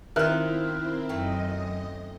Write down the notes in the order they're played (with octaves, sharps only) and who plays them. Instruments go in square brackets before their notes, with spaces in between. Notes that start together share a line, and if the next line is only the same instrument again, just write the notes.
[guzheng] D#3 F4 [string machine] C4 E4 [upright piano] A#4 E5 F#6
[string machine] F#2 D#5 [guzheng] A3 C4